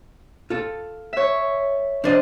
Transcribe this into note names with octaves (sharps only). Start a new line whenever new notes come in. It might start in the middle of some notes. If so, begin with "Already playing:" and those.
F4 A4
C#5 E5
F3 D4 C5 D5 D#5